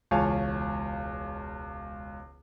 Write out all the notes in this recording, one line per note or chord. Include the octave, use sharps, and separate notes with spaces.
E1 C#2 C#5 F5 G#5 A5